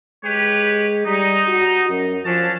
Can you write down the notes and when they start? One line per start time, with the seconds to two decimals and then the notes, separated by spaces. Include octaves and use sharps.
0.25 G#3 G4 B4 C#5
1.06 G3 D#4
1.48 F#4
1.89 F#2
2.26 F3 C#4 D4 A5